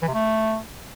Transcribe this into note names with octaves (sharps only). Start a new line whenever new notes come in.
E3
C3
A3